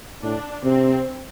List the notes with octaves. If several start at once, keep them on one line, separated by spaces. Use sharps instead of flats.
A2 D4
C3 C4